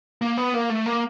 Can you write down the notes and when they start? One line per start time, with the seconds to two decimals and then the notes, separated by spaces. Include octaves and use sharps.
0.22 A#3
0.37 B3
0.54 A#3
0.70 A3
0.86 A#3